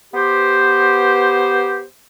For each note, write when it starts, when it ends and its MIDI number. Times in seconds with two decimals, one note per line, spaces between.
0.14 1.83 59
0.14 1.83 67
0.14 1.83 72